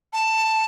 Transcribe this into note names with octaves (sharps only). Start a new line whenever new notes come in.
A5